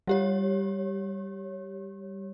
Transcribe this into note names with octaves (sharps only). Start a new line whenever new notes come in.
G3 G4 C#5